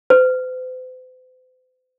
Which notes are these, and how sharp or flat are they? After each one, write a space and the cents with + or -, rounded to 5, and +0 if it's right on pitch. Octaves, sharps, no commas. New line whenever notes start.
C5 -45